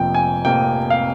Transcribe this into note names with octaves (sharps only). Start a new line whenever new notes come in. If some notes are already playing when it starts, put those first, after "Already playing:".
Already playing: F1 F2 C3 F3 A#3 G5
G#5
F1 F2 C3 F3 A#3 G5
F5